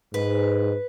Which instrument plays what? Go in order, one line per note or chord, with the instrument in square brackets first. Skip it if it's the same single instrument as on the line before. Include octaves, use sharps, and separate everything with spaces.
[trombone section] G#2 [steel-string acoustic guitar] B4